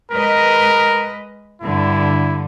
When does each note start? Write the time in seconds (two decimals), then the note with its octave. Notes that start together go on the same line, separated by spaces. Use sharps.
0.11 G#3 A#4 B4 D#5
1.61 G2 D3 E4